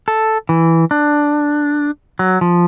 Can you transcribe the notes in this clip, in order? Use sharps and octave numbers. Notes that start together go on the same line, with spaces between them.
A4
E3
D4
F#3
F3